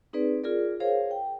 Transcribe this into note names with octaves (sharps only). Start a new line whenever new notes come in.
C4 D#4 G#4 B4 D5
F4 G#4 A#4 D5
G#4 A#4 C5 C#5 F5
G5